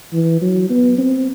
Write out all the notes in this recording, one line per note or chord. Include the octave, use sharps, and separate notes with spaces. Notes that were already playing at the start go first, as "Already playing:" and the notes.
E3
F#3
B3
C4